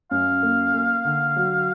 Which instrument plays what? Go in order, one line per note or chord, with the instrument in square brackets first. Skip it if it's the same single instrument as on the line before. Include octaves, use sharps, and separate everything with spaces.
[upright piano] F#2 [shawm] F5
[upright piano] A#3
A#3
D3
F#3